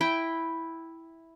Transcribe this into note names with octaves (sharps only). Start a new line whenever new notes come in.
E4 G5